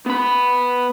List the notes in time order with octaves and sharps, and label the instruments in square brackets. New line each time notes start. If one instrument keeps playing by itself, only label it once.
[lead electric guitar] B3 B5